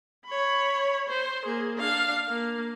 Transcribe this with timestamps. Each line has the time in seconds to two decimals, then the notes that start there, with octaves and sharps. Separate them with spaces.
0.27 C#5 B5
1.09 C5
1.46 A#3 G#4
1.78 D4 F5
2.28 A#3